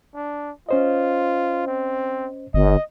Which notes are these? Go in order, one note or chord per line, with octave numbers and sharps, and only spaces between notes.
D4
C#4 F4 C5 D#5
C4
G1 D#5